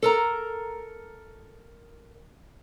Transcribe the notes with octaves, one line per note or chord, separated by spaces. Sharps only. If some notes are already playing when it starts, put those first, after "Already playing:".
A4 A#4 A#5